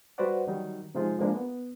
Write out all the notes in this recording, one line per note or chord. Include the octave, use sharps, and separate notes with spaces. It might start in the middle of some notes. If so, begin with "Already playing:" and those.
G3 F#4 B4 C5 D5 F#5
D#3 F#3 G3 D#4
C3 F3 G#3 D#4 F4 G#4
F3 G#3 A#3 D4
B3